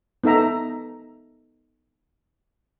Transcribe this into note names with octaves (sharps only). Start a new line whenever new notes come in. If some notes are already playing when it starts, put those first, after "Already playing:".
B3 D#4 A4 E5 A#5